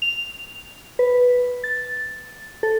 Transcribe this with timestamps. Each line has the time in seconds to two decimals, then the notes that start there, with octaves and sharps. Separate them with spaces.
0.02 F7
0.99 B4
1.64 A6
2.63 A4